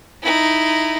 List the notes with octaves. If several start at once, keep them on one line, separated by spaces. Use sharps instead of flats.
D#4 E4